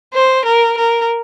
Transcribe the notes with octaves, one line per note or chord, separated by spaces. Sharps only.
C5
A#4
A#4